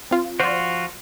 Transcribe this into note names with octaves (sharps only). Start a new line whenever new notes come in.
C4 F4
F3 F4 F#4 C5 D5